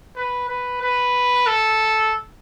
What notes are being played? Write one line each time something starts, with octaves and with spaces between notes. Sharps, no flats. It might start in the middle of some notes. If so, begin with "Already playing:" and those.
B4
B4
B4
A4